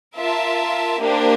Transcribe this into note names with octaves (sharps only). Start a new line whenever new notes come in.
F4 A#4 E5 A5
A#3 D4 G4 C5